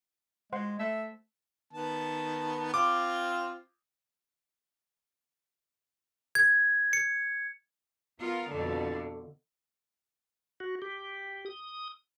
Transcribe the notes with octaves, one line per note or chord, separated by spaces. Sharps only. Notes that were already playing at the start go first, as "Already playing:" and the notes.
G#3 C5 F#5 C6
A3 E5
D#3 B3 A5
C4 F4 D6
G#6
C#7
B3 F4 A#4
F2 B2 D3
F#4
G4
D#6